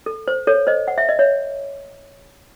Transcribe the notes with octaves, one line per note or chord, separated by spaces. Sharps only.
A4
C5
A4 C#5
C5 D#5
F#5
E5
D#5
C#5 E5